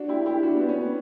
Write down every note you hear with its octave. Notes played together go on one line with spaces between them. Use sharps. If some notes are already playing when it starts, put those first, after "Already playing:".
Already playing: D4 F#4
E4 G4
E4 G4
D4 F#4
B3 D4
C#4
B3